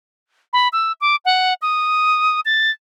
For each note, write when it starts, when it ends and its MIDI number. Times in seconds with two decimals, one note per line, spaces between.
0.53 0.68 83
0.73 0.92 88
1.01 1.16 86
1.25 1.54 78
1.62 2.40 87
2.45 2.71 93